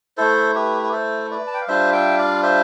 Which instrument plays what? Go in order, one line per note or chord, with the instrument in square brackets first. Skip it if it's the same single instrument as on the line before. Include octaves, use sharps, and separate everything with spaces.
[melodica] A3 E4 A4 C5
G4 B4
B4
A4 C5
B4 D5
A5
G5
F5
G3 D4 F4 C5 E5
E5 G5
D5 F5
C5 E5